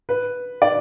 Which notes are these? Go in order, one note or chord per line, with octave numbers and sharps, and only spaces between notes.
B4
D5